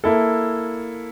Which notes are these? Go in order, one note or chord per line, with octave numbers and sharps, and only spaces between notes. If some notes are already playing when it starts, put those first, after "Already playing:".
A#3 E4 A4